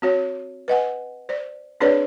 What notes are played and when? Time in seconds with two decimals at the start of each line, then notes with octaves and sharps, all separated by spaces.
0.02 C4 F#4 C#5
0.68 B4 D#5 F#5 G#5
1.29 C5 D5
1.81 C4 D4 G#4 B4 C#5 D5